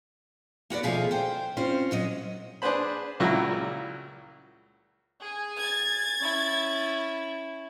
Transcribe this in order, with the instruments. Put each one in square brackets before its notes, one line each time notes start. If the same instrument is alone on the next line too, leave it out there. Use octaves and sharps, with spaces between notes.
[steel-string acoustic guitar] A#3 F#4 B4 D5
D#2 B2 F3 A3 G#4 F5
C5 G5
C4 C#4 F4 C5
A#2 F#3 D#5
[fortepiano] D4 G#4 B4 C5 B5
C#2 A#2 C#3 F#3 E4 E5
[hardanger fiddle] G#4 G#5
[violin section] G#6 A6
[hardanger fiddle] C#4 E4